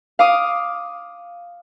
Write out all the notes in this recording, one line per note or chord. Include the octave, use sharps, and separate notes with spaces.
F5 D6 D#6